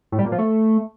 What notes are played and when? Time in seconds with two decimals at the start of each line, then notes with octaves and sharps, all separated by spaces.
0.12 A2
0.19 G3
0.25 A#2
0.32 F3
0.38 A3